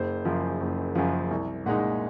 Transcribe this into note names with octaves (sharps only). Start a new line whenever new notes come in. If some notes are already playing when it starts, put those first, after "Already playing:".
Already playing: F#1 C5
F#2 C#3 F3
F#1
F#2 C#3 F3
C2
A#2 G#3 D#4 F#5